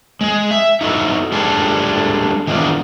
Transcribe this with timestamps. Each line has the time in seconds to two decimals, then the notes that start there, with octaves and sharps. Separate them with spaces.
0.21 G#3 G#4
0.51 E5
0.81 D#4 E4 F#4 A4
1.32 G3 G#3 D4 G#4 A4
2.47 D#3 E3 G#3 B3 D4 F4